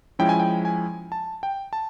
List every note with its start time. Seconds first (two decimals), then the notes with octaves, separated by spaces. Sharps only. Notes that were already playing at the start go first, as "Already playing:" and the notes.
0.19 F3 G#3 C#4 E4 G5
0.29 G#5
0.40 G5
0.65 G#5
1.12 A5
1.43 G5
1.73 A5